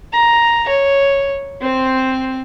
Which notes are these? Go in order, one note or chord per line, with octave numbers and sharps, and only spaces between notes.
A#5
C#5
C4 C5